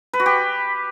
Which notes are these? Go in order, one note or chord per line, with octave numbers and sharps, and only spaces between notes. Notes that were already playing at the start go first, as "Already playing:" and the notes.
B4
F#4
G4